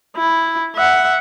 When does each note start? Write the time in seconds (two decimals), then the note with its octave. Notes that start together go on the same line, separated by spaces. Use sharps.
0.17 E4
0.76 E5 F#5